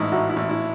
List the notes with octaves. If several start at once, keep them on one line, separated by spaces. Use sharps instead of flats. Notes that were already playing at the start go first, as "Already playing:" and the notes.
Already playing: A1 G#2 D#4 E4
A1 F#4
E4
A1
E4